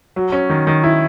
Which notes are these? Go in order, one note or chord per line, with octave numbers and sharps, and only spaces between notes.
F#3
C#4
D#3
D#3
E4